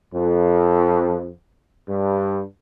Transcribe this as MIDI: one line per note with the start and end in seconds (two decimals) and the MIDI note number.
0.13 1.30 41
1.88 2.41 43